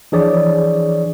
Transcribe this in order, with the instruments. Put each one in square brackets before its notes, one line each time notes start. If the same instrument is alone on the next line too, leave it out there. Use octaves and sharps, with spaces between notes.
[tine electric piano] E3 F3 D4 G#4 C#5 D5